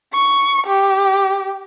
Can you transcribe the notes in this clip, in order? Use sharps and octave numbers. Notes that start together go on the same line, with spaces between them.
C#6
G4